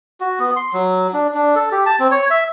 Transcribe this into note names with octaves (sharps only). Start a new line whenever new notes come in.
F#4
B3
C6
F#3
D4
D4
A4
G4
A5
C4
C#5
E5